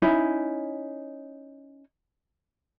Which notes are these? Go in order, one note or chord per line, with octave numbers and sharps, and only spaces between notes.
C#4 D#4 E4